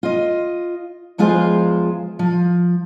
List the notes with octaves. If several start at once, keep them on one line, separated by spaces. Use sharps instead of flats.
F4 D#5
E2 F3 G#3 F4 G#4 C5
F3